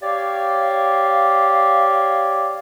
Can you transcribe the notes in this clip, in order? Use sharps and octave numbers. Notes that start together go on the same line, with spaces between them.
G4 C#5 D5 F5